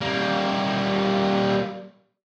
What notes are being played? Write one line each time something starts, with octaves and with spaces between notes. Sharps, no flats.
G3 A#3